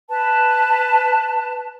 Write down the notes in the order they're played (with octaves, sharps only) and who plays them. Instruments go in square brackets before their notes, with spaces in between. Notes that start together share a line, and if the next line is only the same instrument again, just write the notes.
[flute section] B4 A5